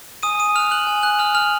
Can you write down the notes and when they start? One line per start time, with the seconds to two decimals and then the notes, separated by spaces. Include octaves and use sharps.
0.23 G#5 D#6 D#7
0.39 D#6 D#7
0.55 D#6 F6 F#6 F7
0.71 F#6 F#7
0.87 G#5
1.02 F#6 F#7
1.19 D#6 F6 F#6 F7
1.35 F6 F7